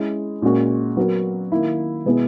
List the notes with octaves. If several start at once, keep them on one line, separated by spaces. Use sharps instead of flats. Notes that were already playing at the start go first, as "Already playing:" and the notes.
Already playing: G#3 C#4 E4
A#2 G#3 C#4 F#4 A#4
F#3 B3 F#4 A#4
D#3 A#3 E4
B2 G#3 B3 E4 G#4